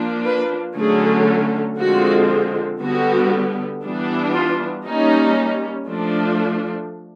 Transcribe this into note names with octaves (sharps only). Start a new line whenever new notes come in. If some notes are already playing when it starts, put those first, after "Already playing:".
Already playing: F3 A#3 D4
B4
D3 F#3 A3 C#4 G#4
D3 F3 G#3 C4 F#4
D3 G3 B3 F#4
E3 G3 B3 D4
F4
G3 A#3 C#4 D#4
F3 A3 D4